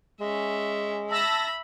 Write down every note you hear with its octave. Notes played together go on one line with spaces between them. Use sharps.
G#3 C#4 E5
E5 A5 B5 E6 A#6